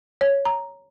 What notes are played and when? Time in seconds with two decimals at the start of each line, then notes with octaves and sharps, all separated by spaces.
0.21 C#5
0.45 A#5